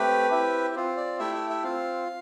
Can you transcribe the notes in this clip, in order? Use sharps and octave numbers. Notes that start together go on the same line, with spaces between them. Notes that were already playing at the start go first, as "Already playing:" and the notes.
Already playing: A3 C4 G4 B4
C4 E4 G4
C4 F4
D5
A3 E4 G4 E5
E5
E5
C4 F4 F5